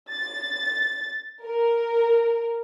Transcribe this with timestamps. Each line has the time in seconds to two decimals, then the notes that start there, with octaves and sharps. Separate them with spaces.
0.12 A6
1.44 A#4